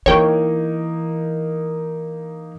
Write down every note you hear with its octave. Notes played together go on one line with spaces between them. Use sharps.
E3 A#3 D#4 C#5 D#5 G5